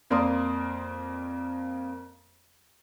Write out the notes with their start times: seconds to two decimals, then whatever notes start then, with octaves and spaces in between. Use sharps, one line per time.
0.10 F2 A#3 A#4 D5 C6 D#6